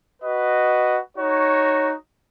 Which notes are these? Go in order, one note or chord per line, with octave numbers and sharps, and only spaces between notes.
F#4 B4 D#5
D#4 F#4 C#5